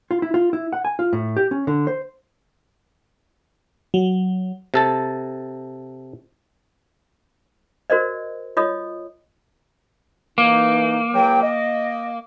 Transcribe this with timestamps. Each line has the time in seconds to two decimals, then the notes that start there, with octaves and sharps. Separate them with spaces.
0.11 F4
0.22 E4
0.34 F4
0.53 E4
0.73 F#5
0.85 G#5
0.99 F4
1.13 A2
1.37 G4
1.51 C#4
1.67 D3
1.87 C5
3.94 F#3
4.74 C3 A4 A5
7.90 F#4 A#4 C5 D5 D#5
8.57 F4 C#5 D#5 D#6
10.38 E3 A#3 D#4
11.14 C#2 F#3 G5
11.42 D#5